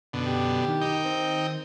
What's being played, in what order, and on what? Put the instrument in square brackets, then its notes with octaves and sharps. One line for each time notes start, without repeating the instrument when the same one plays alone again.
[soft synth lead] F#2 [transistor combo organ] B2 D3
[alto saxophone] G4
[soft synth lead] D#3
[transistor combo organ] D#4 G5
[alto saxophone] C4